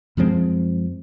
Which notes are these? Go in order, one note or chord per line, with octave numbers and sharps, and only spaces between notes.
F#2 F3 G#3 C4